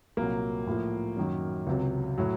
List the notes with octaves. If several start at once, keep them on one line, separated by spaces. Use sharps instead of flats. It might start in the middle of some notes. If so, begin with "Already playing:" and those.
C2 A#2 F#3 A#3
A2 F3
F#2 D#3 F#3
C#2 C3 F#3
A2 F#3